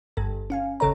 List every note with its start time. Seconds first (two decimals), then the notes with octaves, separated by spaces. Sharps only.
0.17 G1 G2 A4
0.50 C#4 F5 G#5
0.80 G1 D#2 C#3 A4 C#5 A#5